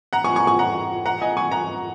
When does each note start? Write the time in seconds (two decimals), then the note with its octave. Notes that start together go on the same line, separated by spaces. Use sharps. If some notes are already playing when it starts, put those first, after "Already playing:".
0.13 F#5 A#5
0.24 G#5 C#6
0.36 G#5 C#6
0.47 G#5 C#6
0.59 F#5 A#5
1.06 F#5 A#5
1.21 D#5 G#5
1.37 G#5 C#6
1.52 F#5 A#5